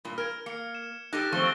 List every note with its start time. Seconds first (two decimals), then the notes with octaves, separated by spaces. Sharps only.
0.05 G2 A#2
0.18 A#4 F6 G#6
0.46 A#3 C#7
0.75 E7
1.13 D#4 G4 A4 F#6 A#6
1.32 F3 A3 C4 C#6 G7